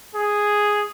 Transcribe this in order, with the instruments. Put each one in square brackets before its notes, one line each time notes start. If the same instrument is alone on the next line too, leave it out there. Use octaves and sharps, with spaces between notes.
[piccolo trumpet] G#4